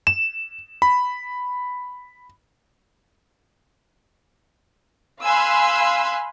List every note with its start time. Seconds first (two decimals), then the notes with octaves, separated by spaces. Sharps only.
0.07 E7
0.82 B5
5.23 F5 G#5 B5 C6 E6 F#6